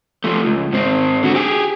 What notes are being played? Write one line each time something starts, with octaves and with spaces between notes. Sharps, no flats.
F3 A3
C#2
G#2 C4
D3 F#4
G4 G#4